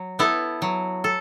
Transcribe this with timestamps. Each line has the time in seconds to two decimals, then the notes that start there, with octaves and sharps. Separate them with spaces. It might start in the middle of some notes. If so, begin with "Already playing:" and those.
Already playing: F#3
0.19 B3 E4 A4
0.62 F#3
1.04 A4